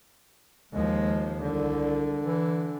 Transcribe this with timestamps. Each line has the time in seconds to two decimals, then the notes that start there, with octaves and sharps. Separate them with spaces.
0.72 D#2 F3 G#3
1.42 C2 D3
2.23 E3